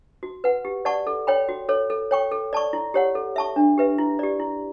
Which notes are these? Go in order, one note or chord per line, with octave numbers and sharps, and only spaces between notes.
F#4
B4 F#5
G4
D5 F#5 A5 C#6
A4
C#5 G5 B5
F#4
A4 C#5
A4
C#5 G5 C#6
A4
D5 A5 C#6
E4
G4 C#5 F#5
A4
E5 A5 C#6
D4
G4 B4 E5
E4
G4 D5
E4